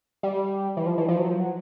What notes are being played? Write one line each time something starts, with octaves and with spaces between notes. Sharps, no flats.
G3
E3
F3
E3
F3
F#3
F3
F#3